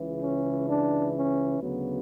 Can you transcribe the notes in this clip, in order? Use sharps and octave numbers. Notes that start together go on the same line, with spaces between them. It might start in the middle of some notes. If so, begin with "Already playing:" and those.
Already playing: C#2 C#3 E3
C#4
D4
C#4
D2 C#3 F#3 B3